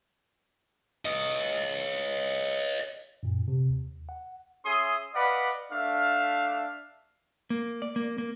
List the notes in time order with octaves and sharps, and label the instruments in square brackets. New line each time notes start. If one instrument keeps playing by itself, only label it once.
[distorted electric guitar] C#5 D#5
[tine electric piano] F#2 A#2
C3
D#2
F#5
[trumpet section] C#4 G#4 E5 C6 D#6
B4 D5 D#5 F5 F#5 B5
A3 D4 E5 F5
[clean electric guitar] A#3
D5
A#3
A#3